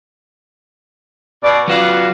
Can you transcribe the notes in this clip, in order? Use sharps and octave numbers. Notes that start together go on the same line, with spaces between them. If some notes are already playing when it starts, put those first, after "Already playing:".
B2 D5
C#3 F#3 B3 F4 F#4 D5